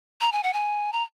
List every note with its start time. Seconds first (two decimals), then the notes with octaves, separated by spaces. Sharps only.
0.21 A#5
0.32 G#5
0.43 F#5
0.53 G#5
0.93 A#5